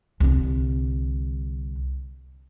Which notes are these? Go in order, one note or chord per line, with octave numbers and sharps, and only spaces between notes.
C2 D3